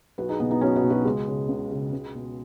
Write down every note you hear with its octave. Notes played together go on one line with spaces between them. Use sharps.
B1 F#4 B4
D#4 G#4
B2 B3 D#4
B3 D#4
B1 C#4 F#4
F#4 B4
B2
F#4 B4
C#2 G#3
C#3
C#2
C#3
C#2
B2